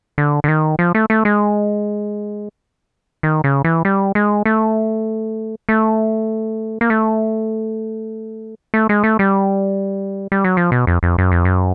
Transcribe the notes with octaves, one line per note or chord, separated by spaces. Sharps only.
D3
D3
D#3
F3
A3
A3
G#3
D#3
C#3
E3
G3
G#3
A3
A3
A#3
A3
A3
G#3
A3
G3
G3
F#3
F3
B2
F2
F2
F#2
F2
F#2